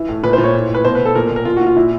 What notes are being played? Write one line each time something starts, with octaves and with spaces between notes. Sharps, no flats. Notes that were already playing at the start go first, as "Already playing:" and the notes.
Already playing: E3
A2
A#2 B4
C5
A#2
C#5
A2
A2
B4
B2 C5
B4
B2
A4
A#2 A#4
A#2
A#4
A#2 F4
F#4
A#2
F4
A#2 E4